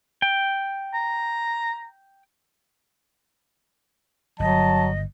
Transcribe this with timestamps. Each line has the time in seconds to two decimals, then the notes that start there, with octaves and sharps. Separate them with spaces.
0.22 G5
0.94 A#5
4.40 G1 F#3 D#5 A5